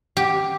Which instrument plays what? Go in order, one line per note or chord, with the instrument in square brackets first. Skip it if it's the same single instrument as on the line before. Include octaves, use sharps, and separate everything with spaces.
[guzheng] G4